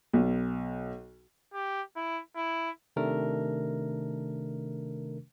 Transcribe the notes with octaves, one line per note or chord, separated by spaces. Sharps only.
B1
G4
E4
E4
C3 D#3 A3 D4 A#4